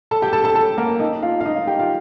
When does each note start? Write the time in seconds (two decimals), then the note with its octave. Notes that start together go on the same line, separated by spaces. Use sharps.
0.11 A4 A5
0.22 G4 G5
0.33 A4 A5
0.44 A4 A5
0.55 A4 A5
0.78 A#3 A#4
1.00 D#4 D#5
1.22 F4 F5
1.40 F5
1.45 D#4 D#5
1.67 G4 G5
1.78 F4 F5